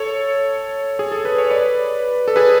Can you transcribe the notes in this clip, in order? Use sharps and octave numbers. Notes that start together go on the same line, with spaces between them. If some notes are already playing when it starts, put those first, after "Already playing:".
Already playing: A4 C#5
G#4
A4
B4
C#5
B4 D5
A4
G#4 B4